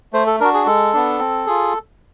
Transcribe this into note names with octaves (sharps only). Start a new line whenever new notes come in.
A3 C5
A4
D4 F#4 A#4
G#4
G#3 A4
B3 D4
C4
F4 G#4